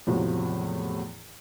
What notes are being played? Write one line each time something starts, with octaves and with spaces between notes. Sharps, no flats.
E2 A2 C3 F3 F#3